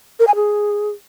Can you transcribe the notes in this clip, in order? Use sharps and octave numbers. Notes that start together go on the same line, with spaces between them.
A#4
G#5
G#4